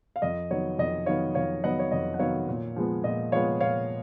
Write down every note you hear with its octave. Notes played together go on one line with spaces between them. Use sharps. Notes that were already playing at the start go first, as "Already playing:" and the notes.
F5
F2 D#5
D#3 F#3 B3 C#5
F2 D#5
D#3 F#3 B3 C#5 F5
F2 C#5 F5
D#3 F#3 B3 D#5 F#5
C#5
F2 D#5
F#5
D#3 F#3 B3 C#5 F5
A#2
F3 G#3 B3
A#2 D#5
F3 G#3 B3 C#5 F5
A#2 C#5 F5